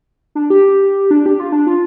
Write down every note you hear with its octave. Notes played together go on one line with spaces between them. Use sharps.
D4
G4
D4
G4
F4
D4
F4